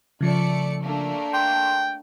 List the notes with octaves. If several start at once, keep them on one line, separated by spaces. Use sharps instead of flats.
C#3 F3 A3 D5 C#7
A3 A#3 D4
G5 C6